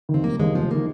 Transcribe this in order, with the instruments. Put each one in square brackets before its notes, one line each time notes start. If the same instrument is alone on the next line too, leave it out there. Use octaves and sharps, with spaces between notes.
[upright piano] D#3
[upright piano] D#2 [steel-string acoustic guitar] C4
[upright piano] F1 [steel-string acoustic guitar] A#3
[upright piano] D#2 D#3 [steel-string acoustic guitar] G#3
[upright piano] F1 [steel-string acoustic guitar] F3
[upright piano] D#3 [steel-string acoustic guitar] A#3